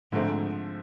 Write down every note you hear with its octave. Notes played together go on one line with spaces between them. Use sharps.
G#2 D3 F3 A3 C4